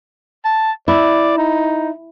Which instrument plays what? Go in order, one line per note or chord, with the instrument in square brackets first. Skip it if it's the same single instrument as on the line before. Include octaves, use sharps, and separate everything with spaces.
[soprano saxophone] A5
[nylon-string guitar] E4 [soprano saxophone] D5
[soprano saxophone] D#4